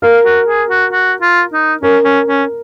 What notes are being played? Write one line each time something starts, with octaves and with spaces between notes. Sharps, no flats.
A#4 F5
F#4
G#4
F#4
F#4
F4
D#4
C#4 A#4
C#4
C#4